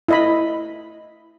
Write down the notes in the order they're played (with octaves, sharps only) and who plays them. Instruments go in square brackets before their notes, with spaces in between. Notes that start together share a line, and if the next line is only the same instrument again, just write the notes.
[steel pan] E4 D#5 B5